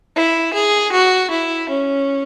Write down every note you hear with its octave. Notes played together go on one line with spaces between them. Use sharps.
E4
G#4
F#4
E4
C#4